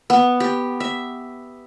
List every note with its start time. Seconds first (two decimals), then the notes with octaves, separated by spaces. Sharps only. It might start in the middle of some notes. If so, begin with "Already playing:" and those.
0.10 B3
0.40 G4
0.80 E5